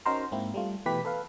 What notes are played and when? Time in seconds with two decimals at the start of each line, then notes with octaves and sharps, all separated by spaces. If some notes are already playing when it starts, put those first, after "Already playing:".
0.05 C#4 D#4 F#4 A#4 C5 A#5
0.32 G#2 A#3 C4 E4
0.54 G3 A3 F4
0.86 B2 E3 A3 G4 B4 B6
1.05 A4 B4 F5